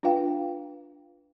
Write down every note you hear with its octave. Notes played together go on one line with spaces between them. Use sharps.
D4 F4 B4 F5 G5